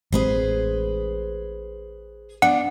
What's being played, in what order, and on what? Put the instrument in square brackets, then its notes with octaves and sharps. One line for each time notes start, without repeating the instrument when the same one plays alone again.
[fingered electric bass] A1 G#3 C4 [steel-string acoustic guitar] G#4 B4 C5
[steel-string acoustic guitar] B3 D4 [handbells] F#5